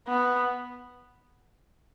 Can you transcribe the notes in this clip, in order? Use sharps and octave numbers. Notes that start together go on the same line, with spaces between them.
B3